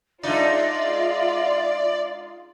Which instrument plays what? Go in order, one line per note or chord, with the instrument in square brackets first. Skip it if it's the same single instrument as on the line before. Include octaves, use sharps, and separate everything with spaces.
[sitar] G#3 D4 D#4 [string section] F4 [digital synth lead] D5 [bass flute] E5